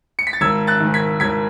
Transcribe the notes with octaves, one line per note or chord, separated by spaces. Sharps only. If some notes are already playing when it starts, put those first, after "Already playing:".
C#7
B6
A6
G#1 E6 G#6
F#6 A6
G#2 D#3
G#6 B6
G#1 G#6 B6